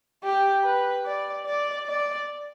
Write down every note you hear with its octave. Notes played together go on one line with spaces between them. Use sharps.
G4
B4
D5
D5
D5